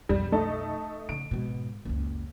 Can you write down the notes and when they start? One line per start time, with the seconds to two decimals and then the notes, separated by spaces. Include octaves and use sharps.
0.09 B1 F2 G3
0.32 A3 D#4 A4
1.09 C#3 D7
1.31 G#2 B2
1.85 F#1 C#2